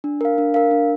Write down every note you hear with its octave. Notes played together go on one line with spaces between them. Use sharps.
D4
A#4 F5
D4
A#4 F5
D4